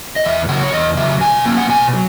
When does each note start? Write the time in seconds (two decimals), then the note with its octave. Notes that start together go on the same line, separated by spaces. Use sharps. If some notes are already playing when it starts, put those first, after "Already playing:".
0.16 D#5
0.25 E2 E5
0.49 C#3 F#3 F#5
0.63 C#5
0.73 E2 D#5
0.97 C#3 F#3 E5
1.21 B2 G#5
1.45 F#3 A#3 C#4
1.57 F#5
1.69 B2 G#5
1.93 F#3